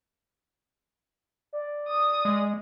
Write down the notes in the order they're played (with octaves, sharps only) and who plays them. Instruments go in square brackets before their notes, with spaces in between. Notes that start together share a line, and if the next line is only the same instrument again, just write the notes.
[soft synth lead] D5
[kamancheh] D#6
[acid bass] G#3